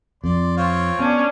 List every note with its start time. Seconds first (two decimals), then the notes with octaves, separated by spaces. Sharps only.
0.24 F2 D5 C6
0.57 C4 F4 C#5
0.99 B3 C#4 D4